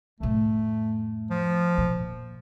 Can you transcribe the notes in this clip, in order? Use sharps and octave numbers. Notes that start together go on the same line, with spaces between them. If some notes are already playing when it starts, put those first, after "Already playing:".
F2 A2 A3
F3
A#2